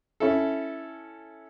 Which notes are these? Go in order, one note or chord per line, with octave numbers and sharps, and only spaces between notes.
C#4 E4 A4